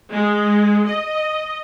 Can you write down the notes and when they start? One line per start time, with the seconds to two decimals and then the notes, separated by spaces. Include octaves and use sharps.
0.11 G#3
0.87 D#5